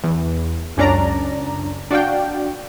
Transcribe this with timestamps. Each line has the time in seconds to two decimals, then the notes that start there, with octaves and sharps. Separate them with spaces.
0.04 E2
0.77 C#2 F#2 C#4 D4 D5 A#5
1.91 D4 F#4 D5 F5 G5